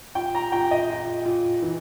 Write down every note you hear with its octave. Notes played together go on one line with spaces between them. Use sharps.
A#2 G5
A#5
A#2 G5
D#5
A#2
A#2
E3